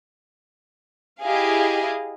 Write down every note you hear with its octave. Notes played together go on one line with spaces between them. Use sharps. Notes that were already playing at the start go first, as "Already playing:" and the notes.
E4 G4 G#4 D#5 F5